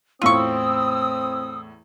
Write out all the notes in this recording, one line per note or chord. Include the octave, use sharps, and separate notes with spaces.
E2 A2 C4 E4 F4 C#6 D#6 E6